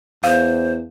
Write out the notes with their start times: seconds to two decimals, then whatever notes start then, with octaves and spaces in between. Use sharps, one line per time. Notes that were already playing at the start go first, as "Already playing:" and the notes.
0.24 E2 C5 F5